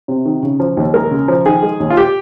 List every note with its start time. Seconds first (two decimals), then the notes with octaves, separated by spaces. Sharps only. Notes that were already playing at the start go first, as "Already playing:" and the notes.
0.08 C3
0.25 D#3
0.43 C#3
0.60 F3
0.77 D#2
0.94 G#3 A#4
1.11 C#3
1.28 F3
1.46 D#3 G#4
1.63 G#3
1.80 D#2
1.90 F4
1.97 G4